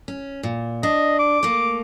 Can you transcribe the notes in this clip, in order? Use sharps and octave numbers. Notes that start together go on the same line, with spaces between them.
C#4
A#2
D4 D#5
D6
A3 A#3